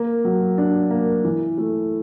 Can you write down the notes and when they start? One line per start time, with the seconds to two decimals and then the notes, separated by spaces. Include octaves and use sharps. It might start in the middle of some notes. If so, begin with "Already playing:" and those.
Already playing: A#3
0.25 F#3
0.58 D4
0.91 A#3
1.24 E3
1.58 A3